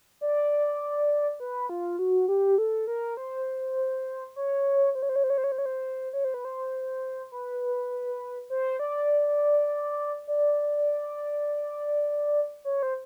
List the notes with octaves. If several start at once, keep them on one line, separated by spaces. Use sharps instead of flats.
D5
B4
F4
F#4
G4
A4
A#4
C5
C#5
C5
C#5
C5
C#5
C5
C#5
C5
C#5
C5
C#5
C5
C#5
C5
B4
C5
B4
C5
D5
D5
C#5
C5